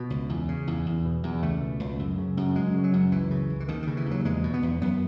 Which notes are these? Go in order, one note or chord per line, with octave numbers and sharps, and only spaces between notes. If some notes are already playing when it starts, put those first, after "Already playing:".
Already playing: B2 B3
C#2
E2
C#3
E2
E2
B2
E2
C#2 A3
B2
C#2
F#2
C#3
F#2
F#2 G#3
C#3
F#3
F#2
C#2 E3
C#3
C#2
E3
D#2 D#3
D#3
C#3
E3
D#2 F#3
E2 G#3
B2
B3
E2
F#2 B3